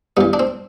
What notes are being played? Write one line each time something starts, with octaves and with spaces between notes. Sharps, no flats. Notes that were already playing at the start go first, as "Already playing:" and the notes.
G2 E3 B3
D4
C4